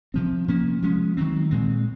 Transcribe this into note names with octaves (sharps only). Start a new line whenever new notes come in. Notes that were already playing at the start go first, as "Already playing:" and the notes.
C3 F3 C4
C3 F3 A#3 C#4
F3 G#3 C#4
D#3 F#3 C4
A#2 G#3 C4